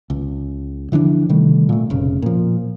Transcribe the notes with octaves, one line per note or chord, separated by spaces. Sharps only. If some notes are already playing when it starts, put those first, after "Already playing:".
C#2
D3 E3 F3 D4
C3 D#3 G3 A3
A#2 A3
F1 C#3
A#2 F3